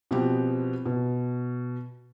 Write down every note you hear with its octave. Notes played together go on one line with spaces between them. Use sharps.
B2 F3 B3 C4 G4
B2